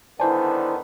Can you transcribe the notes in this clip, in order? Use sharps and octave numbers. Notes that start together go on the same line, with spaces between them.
D3 D#3 B3 E4 C5 D5 G#5 A5